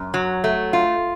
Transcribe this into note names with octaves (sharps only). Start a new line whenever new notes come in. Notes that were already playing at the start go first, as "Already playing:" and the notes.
Already playing: F#2
F#3
A3
F4